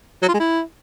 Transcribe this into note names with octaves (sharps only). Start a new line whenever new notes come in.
F#3
F4
G#3
E4